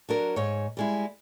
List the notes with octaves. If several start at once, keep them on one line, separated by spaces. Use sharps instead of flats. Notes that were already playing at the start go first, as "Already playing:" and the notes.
F#3 D4 A#4
G#2 C#5
G3 G#3 E4